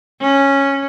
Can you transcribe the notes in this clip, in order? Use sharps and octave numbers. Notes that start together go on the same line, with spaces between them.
C#4